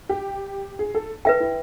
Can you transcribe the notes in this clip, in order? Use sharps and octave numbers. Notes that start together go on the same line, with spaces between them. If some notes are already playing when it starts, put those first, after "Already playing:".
G4
G#4
A4
A4 B4 E5 G5
E4